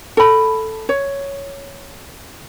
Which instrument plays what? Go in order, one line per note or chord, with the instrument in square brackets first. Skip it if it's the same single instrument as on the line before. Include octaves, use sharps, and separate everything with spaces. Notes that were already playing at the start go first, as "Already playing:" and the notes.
[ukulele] A4 B5
C#5